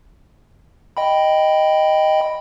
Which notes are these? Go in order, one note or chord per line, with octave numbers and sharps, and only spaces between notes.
D#5 G5 B5